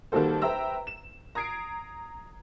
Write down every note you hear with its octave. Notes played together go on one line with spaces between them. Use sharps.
D#3 G3 A#3 F#4 A4 C5
B4 C5 E5 G5 A#5 E6
E7
A#5 D#6 G#6 C7 D7